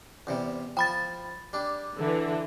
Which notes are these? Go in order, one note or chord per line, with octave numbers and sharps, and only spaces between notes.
E2 C3 G3
F3 G5 B5 A6
G3 D4
D3 E3